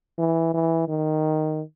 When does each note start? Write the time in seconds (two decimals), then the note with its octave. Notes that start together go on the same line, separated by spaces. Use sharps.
0.19 E3
0.54 E3
0.88 D#3